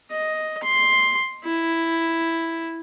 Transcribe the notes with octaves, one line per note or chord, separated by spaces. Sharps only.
D#5
C6
E4